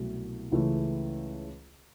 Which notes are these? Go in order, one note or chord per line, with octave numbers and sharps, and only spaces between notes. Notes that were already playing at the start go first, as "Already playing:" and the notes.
Already playing: C2 B2 F#3 A3
C#2 C#3 E3 A3